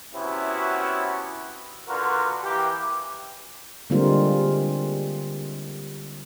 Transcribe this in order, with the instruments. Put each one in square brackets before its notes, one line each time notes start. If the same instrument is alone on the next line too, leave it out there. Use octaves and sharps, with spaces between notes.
[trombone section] C3 B3 C#4 E4 F#4
D3 F4 F#4 A#4 B4
E3 A#3 G4
[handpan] D3 G3 G#3 A#3 C4 F4